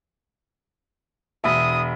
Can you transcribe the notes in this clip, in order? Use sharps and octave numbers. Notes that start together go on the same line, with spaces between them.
E1 E5 D#6